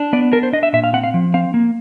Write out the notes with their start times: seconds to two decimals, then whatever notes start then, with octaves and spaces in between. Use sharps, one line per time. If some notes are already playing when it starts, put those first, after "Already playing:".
Already playing: D4
0.13 B3 D5
0.32 D4 A#4
0.43 C5
0.53 D4 D#5
0.63 E5
0.73 A#2 E5
0.84 F5
0.93 C4 F#5
1.04 F5
1.14 F3
1.34 C4 F5
1.54 A#3